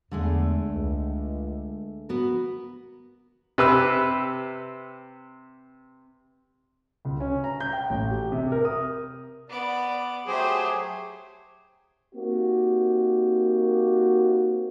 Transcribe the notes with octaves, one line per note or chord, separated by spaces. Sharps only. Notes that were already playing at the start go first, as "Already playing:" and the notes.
E2 D3 G#3 A3
C#2
B3 F#4 A#4
C3 B4 E6
C#2
C#4
A#5
G6
G5
A1
G4
C3
A#4
D#6
B3 D5 D6
F#3 A3 G4 G#4 C5
A#3 C4 D#4 F#4 G4